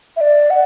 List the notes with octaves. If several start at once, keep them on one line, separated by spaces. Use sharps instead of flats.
E5
D5
F#5